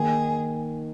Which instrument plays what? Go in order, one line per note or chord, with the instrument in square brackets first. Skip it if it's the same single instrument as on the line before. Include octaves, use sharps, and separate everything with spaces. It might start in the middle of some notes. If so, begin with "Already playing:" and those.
Already playing: [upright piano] D#3 A#3 D#4 A#4 [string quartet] G#4